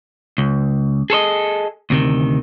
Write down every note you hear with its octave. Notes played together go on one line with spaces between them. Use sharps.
C#2
G#4 A4 C5 D#5
D2 C3 D#3